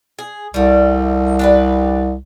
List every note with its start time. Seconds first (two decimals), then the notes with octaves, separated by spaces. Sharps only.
0.19 G#4
0.54 C2 G3 A3
1.39 D4 G4 B4